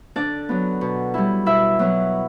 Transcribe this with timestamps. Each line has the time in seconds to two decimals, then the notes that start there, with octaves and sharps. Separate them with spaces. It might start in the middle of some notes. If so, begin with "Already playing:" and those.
0.16 D3 D4 D5
0.49 F#3 B3
0.81 B2
1.14 G3 C#4 E4
1.46 B2 E4 E5
1.79 F#3 B3 E4